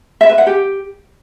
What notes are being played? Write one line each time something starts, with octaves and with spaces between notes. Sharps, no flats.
E5
B4
F#5
G4